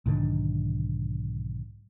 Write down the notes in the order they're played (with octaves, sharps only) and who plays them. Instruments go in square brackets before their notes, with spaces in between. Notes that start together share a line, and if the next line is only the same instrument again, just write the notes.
[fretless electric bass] B1 G#2 D3 D#3